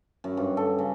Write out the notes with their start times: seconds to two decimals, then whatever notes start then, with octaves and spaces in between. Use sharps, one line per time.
0.24 F#2
0.37 G2
0.57 A4
0.79 C#3